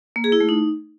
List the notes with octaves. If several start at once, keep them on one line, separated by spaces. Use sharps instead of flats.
A#3
G#4
E4
A3
D#4